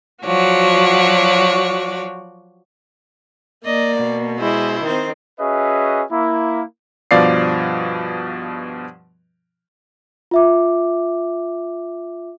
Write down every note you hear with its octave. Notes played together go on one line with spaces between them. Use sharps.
F3 F#3 F#4 C#5 D5
A#3 D5 D#5
B2
G#3 E4 C5
D#3 C4
C#4 F#4 G#4 B4 D#5 E5
A#3 E4
G2 B2 F3 D5 F5 C7
F4 E5 D6